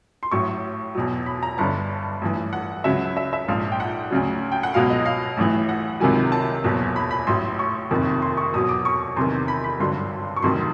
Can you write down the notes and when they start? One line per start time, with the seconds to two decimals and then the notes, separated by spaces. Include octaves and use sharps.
0.23 C6
0.31 A1 A2 F#3 C#6
0.95 E2 B2 F#3
1.26 B5
1.43 A#5
1.58 G1 G2 D3 A5
2.22 A1 G2 E3
2.53 F#5
2.84 C#2 C#3 F#3 E5
3.17 E5
3.33 E5
3.48 A#1 G#2 F3 F5
3.72 G5
3.80 F#5
4.11 D2 C#3 F#3
4.52 G5
4.63 F#5
4.74 C#2 B2 F#3 F5
4.90 D#5
5.06 F5
5.37 A1 A2 E3
5.69 F#5
6.00 C#2 C3 D#3 F#3 G#5
6.32 A5
6.64 F#1 E2 B2 F#3
6.96 B5
7.11 B5
7.27 A1 A2 F#3 C6
7.59 C#6
7.91 F#1 F2 C3 D#3
8.22 C6
8.37 C#6
8.53 E2 B2 F#3 D#6
8.69 D6
8.85 C#6
9.16 E2 C3 D#3 C6
9.48 B5
9.64 B5
9.79 G#1 G2 D3 F#3 C6
10.36 C#6
10.42 F1 F2 C3 D#3 F#3 C6